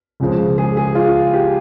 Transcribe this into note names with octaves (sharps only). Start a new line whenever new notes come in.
C#2 C#3 F3 G#3
G#4
G#4
F4
G4